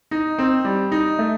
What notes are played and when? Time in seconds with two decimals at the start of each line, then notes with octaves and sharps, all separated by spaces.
0.11 D#4
0.39 C4
0.65 G3
0.92 D#4
1.19 A3